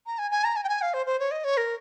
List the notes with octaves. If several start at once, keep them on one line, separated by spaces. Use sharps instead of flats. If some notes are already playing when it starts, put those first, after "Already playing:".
A#5
G#5
G#5
A#5
G#5
G5
G#5
F5
C5
C5
C#5
D#5
C#5
A#4